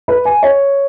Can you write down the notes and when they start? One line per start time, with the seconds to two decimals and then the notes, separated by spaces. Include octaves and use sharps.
0.08 B4
0.25 G#5
0.43 C#5